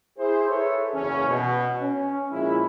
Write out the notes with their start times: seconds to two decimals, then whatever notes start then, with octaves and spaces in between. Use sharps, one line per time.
0.19 E4 G#4 C5
0.49 G#4 A4 B4 C#5 E5
0.95 F#1 E2 C#3 E3 C#4
1.29 B2
1.82 C#4
2.31 A#2 F3 G#3 C#4 E4